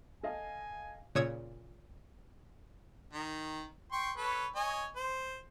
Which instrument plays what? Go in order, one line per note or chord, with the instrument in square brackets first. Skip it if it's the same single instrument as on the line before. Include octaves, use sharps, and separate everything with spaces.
[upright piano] A4 D#5 F5 [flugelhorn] G#5
[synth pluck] A#2 C#3 C#5 D#6 E6 G#6
[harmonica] D#3
G5 C6 C#6
A4 B4 C#5
C#5 D#5 G#5
C5